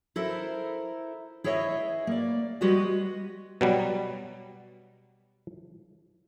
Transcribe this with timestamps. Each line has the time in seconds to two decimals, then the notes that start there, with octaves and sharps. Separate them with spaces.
0.16 E4 A4 A#4 C5 E5
1.44 E4 G#4 B4 C#5 D#5 E5
2.07 A#3 D5
2.61 G3 G#3 F#4 G4 B4 D#5
3.61 B2 F#3 G3